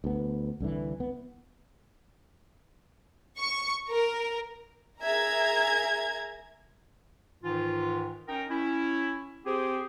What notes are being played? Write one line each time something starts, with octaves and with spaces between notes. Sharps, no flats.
D2 B3
C2 D3 E3
B3
C#6
A#4
G#4 A#4 E5 A#5 G#6
G#2 D#3 E3 F4
C#4 D#4 A#4 G5
C#4 E4
C4 G4 G#4 C5